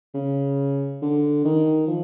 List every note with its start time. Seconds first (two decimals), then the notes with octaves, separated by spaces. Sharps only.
0.15 C#3
1.02 D3
1.45 D#3
1.88 F3